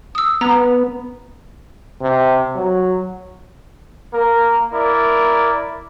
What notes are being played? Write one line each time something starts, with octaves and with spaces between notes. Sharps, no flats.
D#6 E6
B3 A#5
C3
F#3
A#3 A#4
E4 A#4 D5